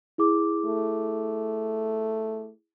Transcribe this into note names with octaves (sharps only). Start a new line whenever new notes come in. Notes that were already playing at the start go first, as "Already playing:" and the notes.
E4 G#4 D6
A3